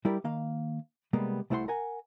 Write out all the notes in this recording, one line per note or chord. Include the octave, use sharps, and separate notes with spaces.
G3 E4 G4 A#4 D5
D#3 A#3 F5
C3 G3 G#3 A#3 B3
C2 A3 E4 C5 F#5 C6
A#4 F#5 G#5